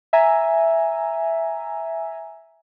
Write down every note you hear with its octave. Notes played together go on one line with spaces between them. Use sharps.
E5 G#5 A#5